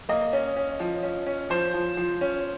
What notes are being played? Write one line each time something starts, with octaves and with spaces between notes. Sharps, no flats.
A#3 D#5
C#4
C#4
F3
C#4
C#4
F3 C5
F3
F3
C#4